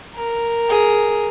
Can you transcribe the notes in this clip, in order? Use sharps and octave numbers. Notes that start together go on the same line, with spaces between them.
A#4
G#4